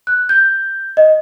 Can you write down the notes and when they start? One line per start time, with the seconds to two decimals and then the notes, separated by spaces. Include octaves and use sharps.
0.07 F#6
0.29 G6
0.97 D#5